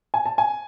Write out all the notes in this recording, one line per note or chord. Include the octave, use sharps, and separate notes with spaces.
G#5
A5
G#5